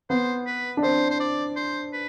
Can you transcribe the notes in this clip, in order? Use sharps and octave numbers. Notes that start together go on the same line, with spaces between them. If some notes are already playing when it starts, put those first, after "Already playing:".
B3 C5
B4
D4
C4 C5
C5
D5
C5
B4